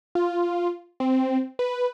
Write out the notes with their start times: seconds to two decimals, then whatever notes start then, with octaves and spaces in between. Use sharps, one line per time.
0.15 F4
1.00 C4
1.59 B4